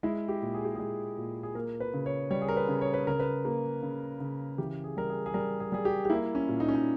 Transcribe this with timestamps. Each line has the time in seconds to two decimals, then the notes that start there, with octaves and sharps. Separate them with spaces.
0.03 G#3 E4
0.28 G4
0.42 A#2
0.54 G#4
0.65 G4
0.75 G#3 G#4
1.17 A#2
1.43 G#4
1.55 A#3 A#4
1.80 B4
1.94 C#3
2.06 C#5
2.30 G3 C#5
2.42 G#4
2.49 A#4
2.57 B4
2.68 C#3
2.81 C#5
2.94 B4
3.07 C#3 A#4
3.20 B4
3.45 A#3
3.83 C#3
4.20 C#3
4.58 E3 G4
4.84 G#4
4.97 G3 A#4
5.10 G#4
5.26 G#4
5.34 G3 A#4
5.60 G#4
5.72 G3 G#4
5.85 G4
6.05 G4
6.10 A#3 E4
6.35 C#4
6.48 A#2
6.60 D#4
6.69 C#4
6.75 D#4